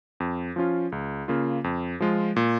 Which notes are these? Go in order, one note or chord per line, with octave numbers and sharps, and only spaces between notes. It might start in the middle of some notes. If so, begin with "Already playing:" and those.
F2
F3 C#4 F4
C#2
C#3 A#3 F4
F2
F3 G#3 F4
A#2